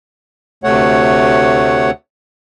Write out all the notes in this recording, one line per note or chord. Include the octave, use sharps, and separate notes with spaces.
D2 C3 A3 C#5 F#5